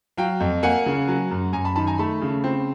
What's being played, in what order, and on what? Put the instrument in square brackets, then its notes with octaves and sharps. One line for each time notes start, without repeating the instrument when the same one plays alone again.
[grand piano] F#3 F5 G5
F2
A#3 F#5 G#5
C#3
F#3
F#2
F#2 G#5 A#5
A5 B5
D#3 A5 B5
G#5 A#5
A3 A5 B5
C#3
C4